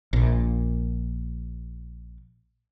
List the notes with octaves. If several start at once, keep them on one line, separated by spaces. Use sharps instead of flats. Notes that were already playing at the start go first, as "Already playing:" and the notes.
A#1 A#2